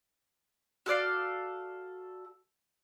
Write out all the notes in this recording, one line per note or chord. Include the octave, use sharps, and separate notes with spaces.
F#4 A4 D5 F5